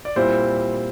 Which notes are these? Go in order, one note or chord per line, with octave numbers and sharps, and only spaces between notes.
D5
A#2 G3 C4 E4 C5